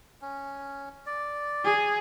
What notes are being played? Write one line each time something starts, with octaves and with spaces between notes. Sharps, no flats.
C#4
D5
G#4